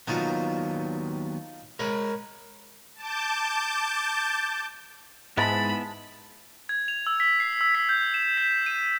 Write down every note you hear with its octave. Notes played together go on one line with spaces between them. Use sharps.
D#2 F#3 B3 D4 D#4 F4
G#3 A#4 C#5 B5
A5 D6 G6
G#2 G#3 B3 E4 A5 B5
G#6
F7
E6
B6
C7
E6
B6
G6
E7
B6
D#7